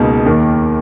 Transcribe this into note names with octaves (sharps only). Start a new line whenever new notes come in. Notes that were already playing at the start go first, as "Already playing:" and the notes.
Already playing: C#2 B2 A#3 D#4
D#2 D#3 A#3